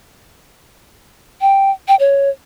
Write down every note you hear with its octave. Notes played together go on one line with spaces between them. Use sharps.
G5
G5
C#5